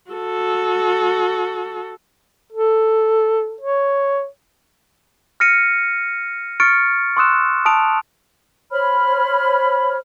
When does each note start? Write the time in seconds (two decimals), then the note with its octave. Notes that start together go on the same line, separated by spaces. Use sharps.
0.11 F#4 A4
2.53 A4
3.61 C#5
5.40 F6 A#6 C#7 D#7
6.60 C#6 F6 A6 C#7 D7
7.17 C6 C#6 D#6 E6 F#6 E7
7.65 A5 D#6 D7 F7
8.71 C5 C#5 B5 F6